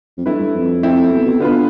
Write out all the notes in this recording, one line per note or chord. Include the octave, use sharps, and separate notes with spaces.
F2
G2 A3 E4 B4
G2
F2
A3 C4 E4
B2
B2
D3 B3 F4 B4